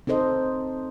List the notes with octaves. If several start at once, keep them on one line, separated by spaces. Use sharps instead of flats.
C4 D#4 A4 C5 D#5